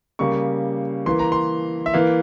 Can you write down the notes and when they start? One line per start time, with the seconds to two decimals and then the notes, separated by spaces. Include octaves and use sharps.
0.19 C#3 G3 A#3 C#6
1.06 E3 A#3 C6
1.19 A#5
1.32 C6
1.86 E5
1.93 E3 A#3 F5